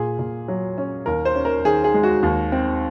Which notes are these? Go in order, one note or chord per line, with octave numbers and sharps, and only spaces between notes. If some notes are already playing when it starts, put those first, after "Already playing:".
Already playing: A#2 G#4
A#2
F#3
C#4
D#2 A#4
C5
C#4
A#4
D#3 G#4
G#4
G#3
F#4
D#2
C4